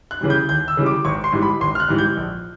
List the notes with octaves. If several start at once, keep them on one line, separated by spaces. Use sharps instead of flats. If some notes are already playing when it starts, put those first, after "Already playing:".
F#6
C#3 E3 G3
G6
D#2 G6
E6
C#3 E3 G3
D6
G#1 C#6
C6
G#2 E3 G3
B5
G#1 C6
F6
F#6
G#2 E3 G3
G6
A#1